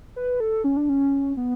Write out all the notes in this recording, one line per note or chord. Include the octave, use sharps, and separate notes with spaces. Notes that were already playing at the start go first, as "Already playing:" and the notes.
B4
A4
C#4
D4
C#4
B3